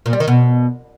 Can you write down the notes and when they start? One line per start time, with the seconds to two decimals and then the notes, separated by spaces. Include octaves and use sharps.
0.06 A#2
0.13 G3
0.20 D#3
0.28 B2